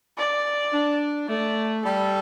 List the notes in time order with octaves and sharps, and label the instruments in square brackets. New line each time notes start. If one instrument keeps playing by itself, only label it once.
[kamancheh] D5
[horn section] D4
[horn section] A3 [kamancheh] D5
[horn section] G3 [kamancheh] A4